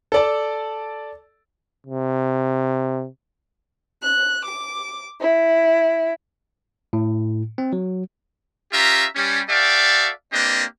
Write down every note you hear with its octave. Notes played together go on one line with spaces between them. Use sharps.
A4 D5 A5
C3
F#6
D6
E4
A2
C4
F#3
C#4 F4 G4 E5 A#5
G3 C#4
F#4 A4 D5 E5 F5 G5
A#3 C4 D4 G4 B4 D#5